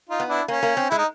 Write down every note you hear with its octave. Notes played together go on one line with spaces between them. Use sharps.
D#4 F4
B3
D4 E4
A#3 C#4
A#3
C4
G#3 E4
D#4